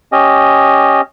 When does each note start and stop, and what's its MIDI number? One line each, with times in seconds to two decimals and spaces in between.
0.12 1.01 61
0.12 1.01 67
0.12 1.01 75